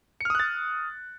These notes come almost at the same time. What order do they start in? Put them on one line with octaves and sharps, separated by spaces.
C#7 F6 D#6 F#6 A6